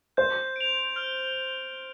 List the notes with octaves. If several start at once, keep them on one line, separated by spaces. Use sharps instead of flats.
C5 G6
D7 F7
F6